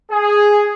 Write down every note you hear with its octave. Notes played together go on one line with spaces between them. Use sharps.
G#4